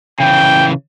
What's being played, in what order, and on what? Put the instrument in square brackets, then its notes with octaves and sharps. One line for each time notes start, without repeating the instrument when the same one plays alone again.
[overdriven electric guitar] C#3 E3 [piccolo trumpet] G5